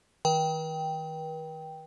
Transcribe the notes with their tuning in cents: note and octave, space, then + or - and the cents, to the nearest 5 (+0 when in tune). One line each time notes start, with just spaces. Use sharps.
D#3 +35 B4 -45 G5 +0